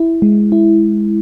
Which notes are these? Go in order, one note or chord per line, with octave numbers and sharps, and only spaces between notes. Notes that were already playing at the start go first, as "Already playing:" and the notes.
Already playing: E4
G#3
E4